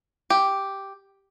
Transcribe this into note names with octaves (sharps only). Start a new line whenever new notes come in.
G4